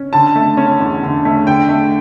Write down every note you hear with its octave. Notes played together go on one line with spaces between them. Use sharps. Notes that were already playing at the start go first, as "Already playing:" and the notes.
Already playing: C#4
D3 A5
A3
C#4
E2
D3
A3
D3 G5
A3